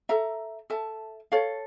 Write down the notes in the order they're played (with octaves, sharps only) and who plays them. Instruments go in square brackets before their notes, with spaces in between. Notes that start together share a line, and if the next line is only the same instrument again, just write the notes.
[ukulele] A4 E5 A#5
A4 E5 A5
A4 C#5 F5